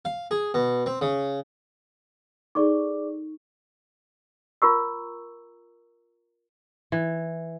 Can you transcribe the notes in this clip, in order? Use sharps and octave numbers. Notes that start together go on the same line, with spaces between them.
F5
G#4
B2
C4
C#3
D#4 G#4 A4 D5 C#6 D6
F4 A#4 A#5 C#6 E6
E3